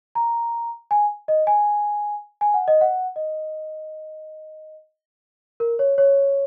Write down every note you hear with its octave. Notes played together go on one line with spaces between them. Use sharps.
A#5
G#5
D#5
G#5
G#5
F#5
D#5
F#5
D#5
A#4
C#5
C#5